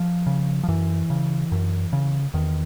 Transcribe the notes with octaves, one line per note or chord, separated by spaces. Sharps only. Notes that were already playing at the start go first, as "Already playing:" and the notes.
Already playing: F3
C#3
F3
F#2 E3
C#3
F#2
C#3
E2 D#3